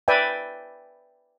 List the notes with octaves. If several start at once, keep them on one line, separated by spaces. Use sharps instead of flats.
B4 D5 E5 G5 G#5